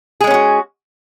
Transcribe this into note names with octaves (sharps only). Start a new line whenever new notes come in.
G#3 B3 C#4 F#4 G#4